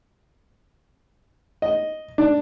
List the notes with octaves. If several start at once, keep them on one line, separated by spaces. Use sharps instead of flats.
D#5
D4